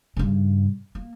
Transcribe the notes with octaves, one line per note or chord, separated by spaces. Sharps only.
G2 C#3
A#3